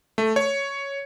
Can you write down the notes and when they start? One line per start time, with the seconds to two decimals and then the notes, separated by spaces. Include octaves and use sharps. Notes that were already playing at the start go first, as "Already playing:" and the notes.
0.18 A3
0.36 C#5